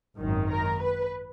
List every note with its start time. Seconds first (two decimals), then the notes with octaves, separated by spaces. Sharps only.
0.19 G#1 F#2 D#3
0.50 A#4
0.81 B4